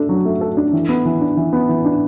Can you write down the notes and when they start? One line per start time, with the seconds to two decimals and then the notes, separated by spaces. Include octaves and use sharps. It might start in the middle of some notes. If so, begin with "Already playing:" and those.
Already playing: A3 D4 A4
0.09 F#3
0.25 A3
0.41 A4
0.57 D4
0.73 E3
0.89 B3
1.05 E3
1.21 D4
1.37 E3
1.53 B3
1.69 E3
1.85 D4